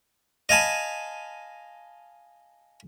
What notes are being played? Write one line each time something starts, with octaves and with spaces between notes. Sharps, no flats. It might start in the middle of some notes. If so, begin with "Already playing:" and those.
D#5 F5 G#5 A5 B5